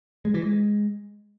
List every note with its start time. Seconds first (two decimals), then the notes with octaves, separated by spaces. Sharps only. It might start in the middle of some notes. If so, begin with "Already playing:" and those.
0.25 G#3
0.34 E3
0.43 G#3